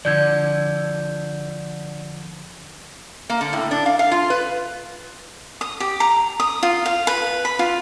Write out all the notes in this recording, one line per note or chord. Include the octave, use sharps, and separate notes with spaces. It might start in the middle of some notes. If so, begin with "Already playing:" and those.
D3 F3 D5 G6 G#6
A#3
D3
A2
D4
F5
F5
F4
B4
D#6
G4
A#5
D#6
F4
F5
B4
B5
F4